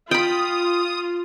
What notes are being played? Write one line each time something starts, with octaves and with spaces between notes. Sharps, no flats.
F4 G5 B5 D#6